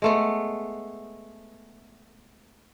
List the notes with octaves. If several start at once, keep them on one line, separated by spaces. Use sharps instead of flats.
G#3 A3 B3